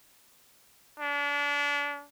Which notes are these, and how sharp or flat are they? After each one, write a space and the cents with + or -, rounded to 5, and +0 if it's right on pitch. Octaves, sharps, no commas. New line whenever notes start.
D4 -35